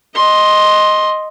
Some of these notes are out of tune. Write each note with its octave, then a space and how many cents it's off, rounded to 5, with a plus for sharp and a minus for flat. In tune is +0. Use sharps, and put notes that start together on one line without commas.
D#5 +0 C6 +10